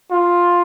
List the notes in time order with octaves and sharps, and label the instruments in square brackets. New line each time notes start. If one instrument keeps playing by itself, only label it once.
[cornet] F4